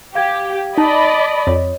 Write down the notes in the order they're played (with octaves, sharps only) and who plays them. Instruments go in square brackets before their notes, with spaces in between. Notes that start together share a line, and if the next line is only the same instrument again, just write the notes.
[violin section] G4 [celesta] F5 G#6
[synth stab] D#4 [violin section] D5 D#5 B5 [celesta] A5
[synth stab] F2 [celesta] C#5